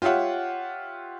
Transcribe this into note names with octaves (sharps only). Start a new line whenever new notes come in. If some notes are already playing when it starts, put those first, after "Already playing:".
F4 G4 C#5 E5 F#5